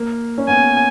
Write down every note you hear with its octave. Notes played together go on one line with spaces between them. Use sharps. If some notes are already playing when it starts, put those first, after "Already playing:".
Already playing: A#3
C#4
B3 G#5